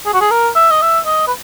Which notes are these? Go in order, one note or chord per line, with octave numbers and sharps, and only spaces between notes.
G#4
F#4
G#4
A#4
E5
D#5
E5
D#5
B4